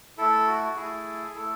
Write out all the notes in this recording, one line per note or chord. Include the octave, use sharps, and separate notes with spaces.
A3 E4 A4
F#4
A3 E4 G#4
A3 E4 A4